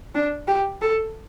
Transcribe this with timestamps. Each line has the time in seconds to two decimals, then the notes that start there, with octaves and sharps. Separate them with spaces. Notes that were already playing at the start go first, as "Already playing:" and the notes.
0.15 D4
0.48 G4
0.82 A4